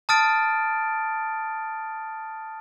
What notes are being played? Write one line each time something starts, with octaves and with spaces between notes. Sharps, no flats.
A5 D#6 F6 A6 D7